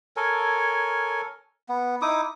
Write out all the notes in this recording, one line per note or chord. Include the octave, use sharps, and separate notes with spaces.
A4 A#4 C#5 G#5
B3
D#4 E4 D6 D#6